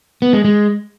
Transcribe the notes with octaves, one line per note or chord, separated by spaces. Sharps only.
B3
G#3
G#3